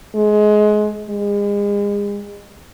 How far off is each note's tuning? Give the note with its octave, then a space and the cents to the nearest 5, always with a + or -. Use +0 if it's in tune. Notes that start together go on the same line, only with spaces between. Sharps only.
G#3 +25
G#3 -35